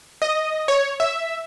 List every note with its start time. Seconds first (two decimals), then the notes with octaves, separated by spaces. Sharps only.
0.22 D#5
0.68 C#5
1.00 E5